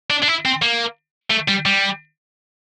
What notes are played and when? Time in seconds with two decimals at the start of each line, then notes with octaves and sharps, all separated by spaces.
0.10 D4
0.23 D4
0.28 E4
0.45 C4
0.62 A#3
1.30 A3
1.48 G3
1.65 G3